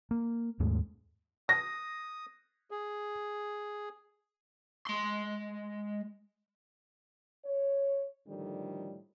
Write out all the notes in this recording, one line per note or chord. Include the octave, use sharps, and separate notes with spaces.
A#3
D#2 G#2 G#3 A3
D#6 A#6
G#4
G#3 C6
C#5
A2 D3 D#3 F3 G3